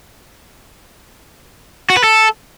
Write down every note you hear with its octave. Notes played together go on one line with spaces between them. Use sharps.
F#4
B4
A4